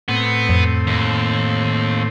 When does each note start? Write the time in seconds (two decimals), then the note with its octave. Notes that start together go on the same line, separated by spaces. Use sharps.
0.08 A2 B3 C4
0.49 F2
0.87 D#2